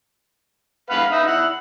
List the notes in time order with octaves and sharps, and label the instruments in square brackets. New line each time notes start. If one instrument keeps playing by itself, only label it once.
[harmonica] B4 F5 F#5
D#4 E5 D#6
E4 F#5